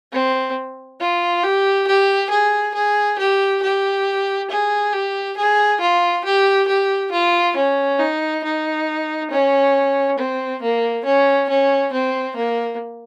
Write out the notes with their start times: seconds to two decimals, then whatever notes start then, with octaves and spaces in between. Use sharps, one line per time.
0.12 C4
1.00 F4
1.43 G4
1.87 G4
2.30 G#4
2.74 G#4
3.19 G4
3.63 G4
4.50 G#4
4.93 G4
5.36 G#4
5.81 F4
6.24 G4
6.68 G4
7.12 F4
7.56 C#4
7.99 D#4
8.44 D#4
9.31 C#4
10.18 C4
10.62 A#3
11.05 C#4
11.49 C#4
11.92 C4
12.36 A#3